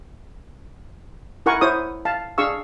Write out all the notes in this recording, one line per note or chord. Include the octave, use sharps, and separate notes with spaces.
E4 A#4 F#5 G#5 C#6
E4 C5 C#5 D#6
F5 A5
D4 G#4 F5 C#6 E6